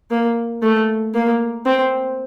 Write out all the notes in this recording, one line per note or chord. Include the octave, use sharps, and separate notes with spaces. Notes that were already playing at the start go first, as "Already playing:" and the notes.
A#3
A3
A#3
C4